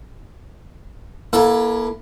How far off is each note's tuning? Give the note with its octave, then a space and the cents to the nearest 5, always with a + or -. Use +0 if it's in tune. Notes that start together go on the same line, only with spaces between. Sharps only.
A#3 +35 E4 +0 A4 +0